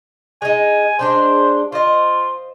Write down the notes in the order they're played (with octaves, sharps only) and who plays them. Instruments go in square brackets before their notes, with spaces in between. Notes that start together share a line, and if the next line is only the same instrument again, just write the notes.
[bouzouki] G#3 D#4 [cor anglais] G#5
[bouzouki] G#3 D4 G#4 [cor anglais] C5
[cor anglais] F4 [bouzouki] C5 D#5